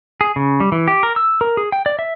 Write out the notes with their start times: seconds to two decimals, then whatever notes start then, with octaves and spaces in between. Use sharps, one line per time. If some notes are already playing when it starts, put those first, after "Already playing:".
0.21 G#4
0.36 C#3
0.60 G3
0.72 E3
0.88 G4
1.03 A#4
1.16 E6
1.41 A#4
1.57 G#4
1.72 G5
1.86 D5
1.99 E5